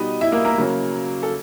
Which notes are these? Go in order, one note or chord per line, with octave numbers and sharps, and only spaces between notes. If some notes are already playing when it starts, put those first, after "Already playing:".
Already playing: B2 G3 B3 D#4 D#5
E4 E5
A#3 A#4
A#3 A#4
C#3 F#3 A#3 C#4
A4